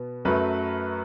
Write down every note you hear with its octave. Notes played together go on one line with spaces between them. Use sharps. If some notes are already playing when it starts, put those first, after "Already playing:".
Already playing: B2 B3
F#2 F#3 A3 B4